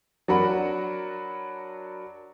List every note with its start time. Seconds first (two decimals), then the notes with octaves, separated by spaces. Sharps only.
0.28 F#3 D4 F#4 A#4 F#5 B5